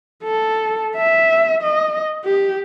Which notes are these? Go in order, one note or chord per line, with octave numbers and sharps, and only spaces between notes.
A4
E5
D#5
G4